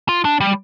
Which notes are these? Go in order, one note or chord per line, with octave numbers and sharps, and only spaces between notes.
F4
D4
G3